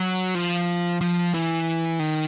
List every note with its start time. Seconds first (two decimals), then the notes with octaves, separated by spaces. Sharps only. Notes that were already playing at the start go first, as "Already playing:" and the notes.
Already playing: F#3
0.35 F3
1.01 F3
1.34 E3
2.00 D#3